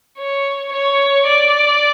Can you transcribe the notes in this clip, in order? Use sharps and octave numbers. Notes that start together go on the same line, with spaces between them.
C#5
C#5
D5